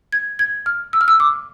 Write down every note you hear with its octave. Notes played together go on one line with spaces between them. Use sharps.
G#6
G#6
F6
E6
F6
E6
D6